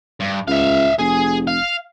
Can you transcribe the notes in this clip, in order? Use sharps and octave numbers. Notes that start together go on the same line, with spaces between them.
G2
C#2 E5 F5
F1 G#4
F5